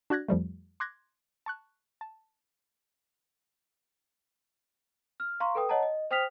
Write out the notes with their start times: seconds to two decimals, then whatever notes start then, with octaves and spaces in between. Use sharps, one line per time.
0.10 D4 F#4 D5 F#6 G#6 A#6
0.28 F2 F3 G3 A3
0.80 C6 D6 F#6 G#6 A#6
1.46 A5 C#6 F#6
2.01 A5
5.20 F6
5.40 F5 A#5 C6 C#6
5.55 A4 B4 G5 D#6
5.69 C#5 D#5 F#5 A5 A#5
5.83 D#5
6.11 C5 G5 D#6 F6 B6 F7